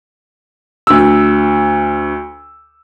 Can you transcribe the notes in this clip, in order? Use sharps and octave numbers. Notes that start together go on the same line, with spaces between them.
D2 E6